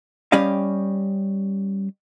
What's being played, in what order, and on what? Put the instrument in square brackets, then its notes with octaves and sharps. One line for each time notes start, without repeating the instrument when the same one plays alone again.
[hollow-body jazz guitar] G3 C#4 G4 D#5 F5